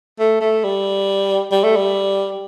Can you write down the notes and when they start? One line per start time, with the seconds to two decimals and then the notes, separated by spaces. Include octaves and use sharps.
0.19 A3
0.41 A3
0.64 G3
1.52 G3
1.64 A3
1.77 G3